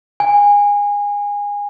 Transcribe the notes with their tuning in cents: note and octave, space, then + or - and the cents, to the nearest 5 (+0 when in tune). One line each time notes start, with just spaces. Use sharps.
G#5 -25